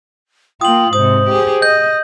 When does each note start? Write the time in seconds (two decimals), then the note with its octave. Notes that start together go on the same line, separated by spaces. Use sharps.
0.61 A#3 F4 G5 D#6 F#7
0.93 G#2 C3 C5 D#6
1.29 G4 G#4
1.62 D#5 G6